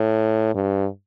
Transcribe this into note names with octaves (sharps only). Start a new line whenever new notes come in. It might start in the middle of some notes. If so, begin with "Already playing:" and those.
Already playing: A2
G2